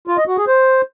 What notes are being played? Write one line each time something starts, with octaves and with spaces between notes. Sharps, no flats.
F4
D#5
F#4
G#4
C5